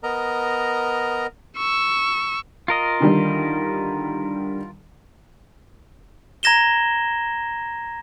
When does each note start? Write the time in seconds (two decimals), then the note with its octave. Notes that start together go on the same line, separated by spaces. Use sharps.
0.03 B3 A#4 D#5 A#5
1.57 C#6 E6
2.68 F4 A#4 D#5
3.00 D3 D#3 G3
6.43 A#5 G#6 A#6 E7 G7